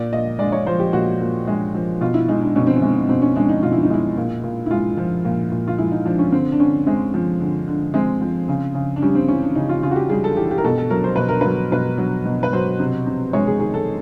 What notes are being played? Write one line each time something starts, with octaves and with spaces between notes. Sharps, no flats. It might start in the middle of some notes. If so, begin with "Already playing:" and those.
Already playing: A#2 D5
A#2 D#5
G#3 D5
C#5
F3 C5
G4
A#2 F#4
A#2
G#3
F3
B2 F4
E4
G#3 D#4
D4
B2 C#4
C4
C#4
G#3
B2 C4
C#4
G#3 D4
D#4
B2 F4
E4
D#4
G#3 E4
A#2
A#2
E4
G#3 F4
F3
A#2
A#2
F4
G#3 E4
D#4
F3 D4
C#4
D3 C4
D4
D3 C#4
G#3 C4
F3
D3
D3
G#3 C4
F3
C#3
C#3
D4
G3 C#4
C4
E3 C#4
D4
C#3 D#4
F4
C#3 F4
F#4
G4
G3 G#4
A4
E3 G4
G4
A#4
B2 A4
A4
F#3 A#4
C5
B2 B4
A#4
F#3 B4
B2 B4
F#3
B2
B4
F#3 C5
C3
C3
G#3 C#5
G#4
D#3 G#4
A4